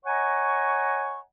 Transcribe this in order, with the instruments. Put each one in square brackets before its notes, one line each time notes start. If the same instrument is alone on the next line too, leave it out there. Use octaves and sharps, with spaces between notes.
[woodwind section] C#5 D#5 F#5 G#5 A#5 C#6